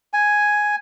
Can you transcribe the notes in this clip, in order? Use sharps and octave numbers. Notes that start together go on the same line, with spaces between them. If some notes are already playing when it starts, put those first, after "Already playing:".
G#5